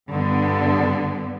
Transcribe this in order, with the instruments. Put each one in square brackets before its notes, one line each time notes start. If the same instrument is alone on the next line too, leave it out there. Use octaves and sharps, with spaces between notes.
[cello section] G2 D3 G3 B3